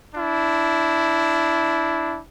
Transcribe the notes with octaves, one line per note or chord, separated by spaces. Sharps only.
D4 E4